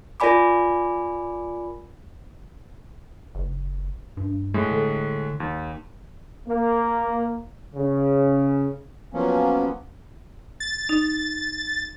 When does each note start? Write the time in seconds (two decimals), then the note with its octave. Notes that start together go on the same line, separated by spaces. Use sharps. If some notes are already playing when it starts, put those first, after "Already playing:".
0.20 F4 A#4 D5 G#5 B5 D6
3.35 F#1
4.17 G2
4.54 A2 G#3
4.72 D3
5.40 D#2
6.48 A#3
7.76 C#3
9.14 F3 F#3 A#3 B3 C#4
10.60 A6
10.89 D#4